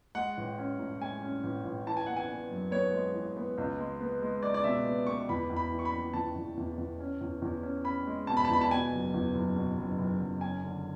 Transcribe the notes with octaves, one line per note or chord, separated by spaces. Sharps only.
G#3 F#5
A1
C#4
A2
G#3 G#5
C#4
A1
A1
E3 A5
G#5
B3 F#5
G#5
B3
F#2
B3 C#5
G#3
E3
B3
C#2
G#3
B3
G#3
G#3 D5
D5
B2 E5
B3
B3 C#6
E2 B5
E2
B5
E3
C#6
B5
E3
E2 A5
E2
E2
E2
C#4
E2
E2
C#4
C#4 B5
G#3
B2 A5
B5
A5
E2 B5
A5
B2 G#5
F#1
E2
F#1
B2
F#1
F#1
F#1
C#4 G#5
D3